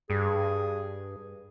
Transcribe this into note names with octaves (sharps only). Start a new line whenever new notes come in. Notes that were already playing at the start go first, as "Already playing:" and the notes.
G2 G#4